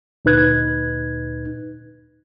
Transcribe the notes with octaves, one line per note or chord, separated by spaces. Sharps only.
D2 A#2 D#4 B4 F#6 G#6